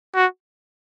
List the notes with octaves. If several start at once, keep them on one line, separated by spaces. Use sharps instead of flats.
F#4